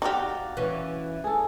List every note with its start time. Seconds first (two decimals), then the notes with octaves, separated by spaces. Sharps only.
0.02 D#4 F#4 G4 D5 F5
0.57 E3 C#4
1.24 G#4 A4